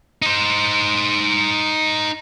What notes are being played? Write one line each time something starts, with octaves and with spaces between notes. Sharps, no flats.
D#4 C5